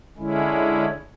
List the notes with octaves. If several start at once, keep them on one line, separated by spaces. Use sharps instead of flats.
D3 G#3 C#4 E4